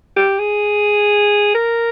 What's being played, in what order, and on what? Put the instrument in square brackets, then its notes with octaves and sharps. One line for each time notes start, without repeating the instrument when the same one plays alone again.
[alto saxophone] G4
G#4
A#4